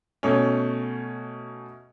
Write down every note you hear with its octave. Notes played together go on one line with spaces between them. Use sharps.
B2 A3 C#4